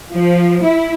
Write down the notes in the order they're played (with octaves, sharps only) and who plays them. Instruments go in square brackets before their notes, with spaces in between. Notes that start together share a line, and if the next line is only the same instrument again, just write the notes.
[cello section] F3
E4